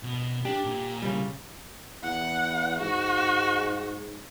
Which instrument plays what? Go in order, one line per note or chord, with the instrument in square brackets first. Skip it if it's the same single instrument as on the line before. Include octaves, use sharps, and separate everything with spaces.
[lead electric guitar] B2
[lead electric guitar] D4 [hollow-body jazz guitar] G4
[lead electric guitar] A#2
[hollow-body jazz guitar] C#3 G3
[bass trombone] E2 [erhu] F#5
[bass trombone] G#2 [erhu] F#4